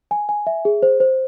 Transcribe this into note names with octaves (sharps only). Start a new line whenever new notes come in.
G#5
G#5
E5
G#4
C5
C5